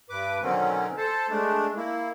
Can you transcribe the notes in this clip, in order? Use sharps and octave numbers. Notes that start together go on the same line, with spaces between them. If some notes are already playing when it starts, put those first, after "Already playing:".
G2 B4 D6
B2 D3 D#3 F#3 C4 C#4
A4 C5 A5
G#3 A3 D4
A#3 E4